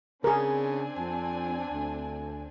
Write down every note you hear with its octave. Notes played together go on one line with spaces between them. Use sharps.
C#3 C4 D4 G#4 A#4 G#5
F2
D2